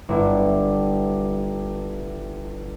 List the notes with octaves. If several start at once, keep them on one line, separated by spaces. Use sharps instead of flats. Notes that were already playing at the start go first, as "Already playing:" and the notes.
G1 E4